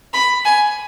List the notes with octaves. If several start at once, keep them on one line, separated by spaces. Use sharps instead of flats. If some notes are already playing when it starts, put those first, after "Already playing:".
B5
G#5